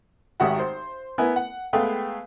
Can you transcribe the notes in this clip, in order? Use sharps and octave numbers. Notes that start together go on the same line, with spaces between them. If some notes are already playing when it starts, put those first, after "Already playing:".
G#1 D#3 F#4 G4 E5 F#5
C5
B3 E4 A#4 B4 G#5
F#5
G#3 A3 B3 G#4 F5 G5